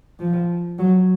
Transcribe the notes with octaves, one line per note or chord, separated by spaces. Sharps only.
F3
F#3